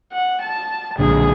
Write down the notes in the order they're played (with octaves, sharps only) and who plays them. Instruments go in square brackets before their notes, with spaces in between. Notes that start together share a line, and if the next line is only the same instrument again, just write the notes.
[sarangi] F#5
A5
[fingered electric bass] B1 A#2 D3 [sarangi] G#4